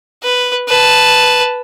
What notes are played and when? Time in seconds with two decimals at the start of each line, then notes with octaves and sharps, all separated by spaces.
0.23 B4
0.68 B4 A5